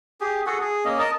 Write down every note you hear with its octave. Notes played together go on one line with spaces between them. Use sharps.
G4 G#4
F#4 G#4 A4 F#5
G#4
A#3 C#4 D#5
A#4 D#5 A5